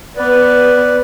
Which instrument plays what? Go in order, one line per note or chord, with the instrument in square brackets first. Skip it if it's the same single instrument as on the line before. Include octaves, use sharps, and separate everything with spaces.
[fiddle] B3 [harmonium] B4 D5